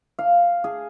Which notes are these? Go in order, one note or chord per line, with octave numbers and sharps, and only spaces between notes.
F5
G#4